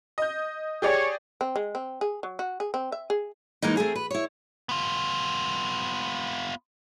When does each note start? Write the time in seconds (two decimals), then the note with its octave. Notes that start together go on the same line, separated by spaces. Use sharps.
0.18 D#5 G6
0.82 G4 G#4 C#5 D5
1.41 C4
1.56 G#3
1.75 C4
2.01 G#4
2.23 F#3
2.39 F#4
2.60 G#4
2.74 C4
2.92 E5
3.10 G#4
3.62 E3 G#3 A#3 D#4
3.76 A3 C4 G#4 A#4
3.95 B4
4.11 E4 C#5
4.69 B3 F4